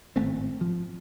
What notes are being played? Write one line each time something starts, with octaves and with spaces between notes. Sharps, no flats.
G#1 A2 A3 C4
F3